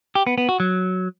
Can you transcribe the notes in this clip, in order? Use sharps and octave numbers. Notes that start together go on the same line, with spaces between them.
G4
B3
B3
F#4
F#3